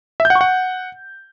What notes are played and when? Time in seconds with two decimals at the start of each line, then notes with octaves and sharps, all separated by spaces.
0.20 E5
0.25 G6
0.30 F#5
0.35 C#6
0.41 F#5